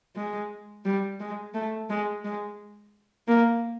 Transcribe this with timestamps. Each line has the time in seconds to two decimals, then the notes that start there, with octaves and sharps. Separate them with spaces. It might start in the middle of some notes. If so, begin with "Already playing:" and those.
0.16 G#3
0.85 G3
1.20 G#3
1.54 A3
1.90 G#3
2.24 G#3
3.28 A#3